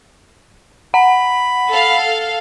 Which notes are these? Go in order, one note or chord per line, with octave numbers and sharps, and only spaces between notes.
F#5 B5
A4 F5